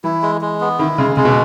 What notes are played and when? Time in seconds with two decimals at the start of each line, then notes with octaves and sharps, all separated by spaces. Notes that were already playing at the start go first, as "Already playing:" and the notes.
0.04 E3 E4
0.22 G#3
0.41 G#3
0.61 B3
0.79 D#3 E4
0.98 C#3 G#3
1.16 C#3 G#3
1.25 B2